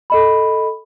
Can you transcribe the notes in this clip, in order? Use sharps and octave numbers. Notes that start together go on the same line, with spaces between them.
A4 D#5 B5